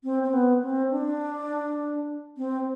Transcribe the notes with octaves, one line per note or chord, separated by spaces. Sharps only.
C4
C4
B3
C4
D4
C4